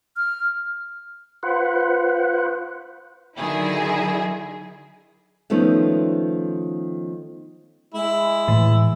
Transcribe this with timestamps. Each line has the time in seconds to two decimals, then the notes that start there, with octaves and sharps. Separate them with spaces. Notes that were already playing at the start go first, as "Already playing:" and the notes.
0.17 F6
1.43 F4 B4 C5 F#5
3.37 D3 D#3 F#3 E4 G#4
5.50 D#3 F3 A3 B3 C#4
7.94 G#3 E4
8.48 A2 E3